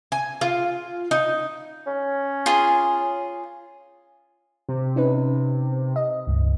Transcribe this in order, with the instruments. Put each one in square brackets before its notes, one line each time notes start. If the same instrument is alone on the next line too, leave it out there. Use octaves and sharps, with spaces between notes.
[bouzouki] G#5
F4
D#4
[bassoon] C#4
[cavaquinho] F4 G#4
[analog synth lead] C3
[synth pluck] C#4 D#4 B4
D#5
C#2 G2